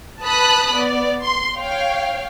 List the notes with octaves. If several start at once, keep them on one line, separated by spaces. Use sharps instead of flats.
B4 A5 B5 D#6 F#6
B3 D5
C6
C#5 F5 G5